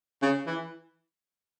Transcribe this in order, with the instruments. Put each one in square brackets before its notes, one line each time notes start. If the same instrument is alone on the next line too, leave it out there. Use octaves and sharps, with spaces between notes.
[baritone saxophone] C#3
E3